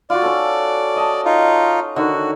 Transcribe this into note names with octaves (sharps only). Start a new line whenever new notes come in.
F4 F#4 D5
C#4 A4
D#5 A5
D#4 F4
D3 D#3 F#4 C#5